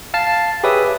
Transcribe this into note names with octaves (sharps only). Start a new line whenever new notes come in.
F5 A5 C7
G4 G#4 B4 C#5 E5 D#6